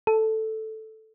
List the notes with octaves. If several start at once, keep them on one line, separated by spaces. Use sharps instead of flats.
A4